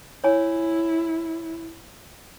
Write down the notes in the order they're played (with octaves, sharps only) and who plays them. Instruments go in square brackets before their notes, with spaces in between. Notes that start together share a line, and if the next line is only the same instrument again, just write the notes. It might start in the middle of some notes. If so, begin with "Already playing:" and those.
[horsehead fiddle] E4 [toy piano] C#5 G#5